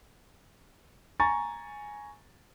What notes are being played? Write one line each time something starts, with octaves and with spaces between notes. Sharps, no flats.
G#5 A#5 C#6 A6